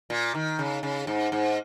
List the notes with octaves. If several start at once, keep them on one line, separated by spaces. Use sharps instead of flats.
A#2
D#3
C#3
C#3
G#2
G#2